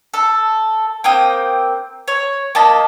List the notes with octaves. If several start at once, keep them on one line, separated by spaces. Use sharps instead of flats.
A4
A#3 C4 G5 D#6
C#5
A#3 D#5 A5 B5